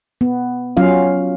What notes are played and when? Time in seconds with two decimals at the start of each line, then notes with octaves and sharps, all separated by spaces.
0.21 B3
0.77 F#3 C#4 F4 F5